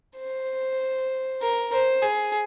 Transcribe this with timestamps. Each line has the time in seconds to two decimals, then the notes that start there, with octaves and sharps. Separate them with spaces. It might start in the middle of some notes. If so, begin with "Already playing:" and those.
0.18 C5
1.41 A#4
1.72 C5
2.02 G#4